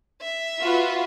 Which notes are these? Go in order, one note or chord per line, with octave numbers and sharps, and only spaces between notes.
E5
F4 F#4 B4